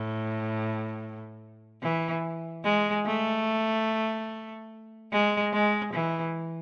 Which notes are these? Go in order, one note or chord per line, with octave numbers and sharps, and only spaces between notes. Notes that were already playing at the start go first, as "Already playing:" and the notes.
Already playing: A2
E3
G#3
A3
G#3
G#3
E3